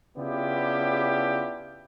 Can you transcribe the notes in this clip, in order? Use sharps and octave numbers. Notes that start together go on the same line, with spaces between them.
C#3 B3 D4 E4 F4 G4